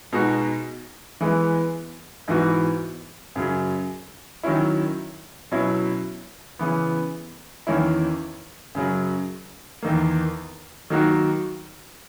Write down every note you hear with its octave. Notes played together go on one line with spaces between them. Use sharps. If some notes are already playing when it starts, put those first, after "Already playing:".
B2 G#3 D#4 F#4
E3 G#3 B3
G#2 E3 B3 F#4
F#2 C#3 F#3
D#3 F#3 C#4 E4
B2 F#3 C#4 E4
C#3 E3 B3
E2 D#3 A#3 C#4 E4
F#2 C#3 F#3
E2 D#3 A#3
D#3 F#3 A#3 D#4 F#4